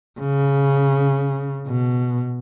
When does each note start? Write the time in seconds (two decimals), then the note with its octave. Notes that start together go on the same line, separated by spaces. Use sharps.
0.20 C#3
1.67 B2